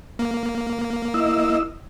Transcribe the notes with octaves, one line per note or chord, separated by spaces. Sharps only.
A#3
E4 D#5 E6